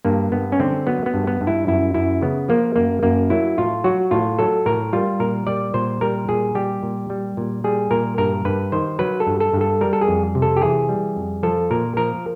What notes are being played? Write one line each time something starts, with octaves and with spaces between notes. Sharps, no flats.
G2 A#3
G2 B3
C#4
D3 C4
F#3 B3
B3
G2
B3
G2
E4
F#2 E4
F#2 E4
C#3 B3
F3 A#3
F#2 A#3
F#2 A#3
F#3 E4
A2 F4
F#3 F#4
A2 F4
F#3 A4
A2 A#4
G3 F4
A#2 A#4
G3 D5
A#2 C5
G3 A#4
A#2 G#4
G3 G4
A#2
G3
A#2
G3 G#4
A#2 A#4
G2 A#4
G2 B4
D#3 C5
F#3 B4
A4
G2
A4
G2
A4
G3 A#4
A4
G#4
F2
C3
A4
G4
E3 G#4
G3
F2
F3 A4
A#2 A#4
F3 A#4